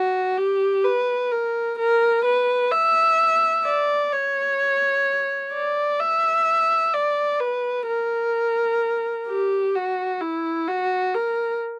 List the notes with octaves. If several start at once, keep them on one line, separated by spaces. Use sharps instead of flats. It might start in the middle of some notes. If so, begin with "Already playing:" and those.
Already playing: F#4
G4
B4
A#4
A#4
B4
E5
D5
C#5
D5
E5
D5
B4
A#4
G4
F#4
E4
F#4
A#4